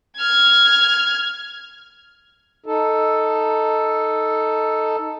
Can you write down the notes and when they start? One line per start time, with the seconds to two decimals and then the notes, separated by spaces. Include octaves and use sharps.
0.18 F6 G#6
2.66 D#4 A4